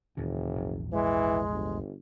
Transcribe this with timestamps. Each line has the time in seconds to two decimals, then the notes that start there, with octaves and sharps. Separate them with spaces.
0.17 F#1 D#2 A#2 E3
0.55 A#1 E2 G#2
0.92 E3 G#3
1.52 G1